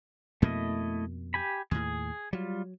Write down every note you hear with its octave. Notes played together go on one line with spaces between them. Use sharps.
F2 B2 A3 A#3 E4 D#5
G4 G#5 B5
D#2 A2 G#4
F#3 G3 F4